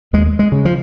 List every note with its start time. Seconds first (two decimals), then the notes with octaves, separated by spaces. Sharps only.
0.13 D#2 G#3
0.39 G#3
0.52 C#3
0.65 F3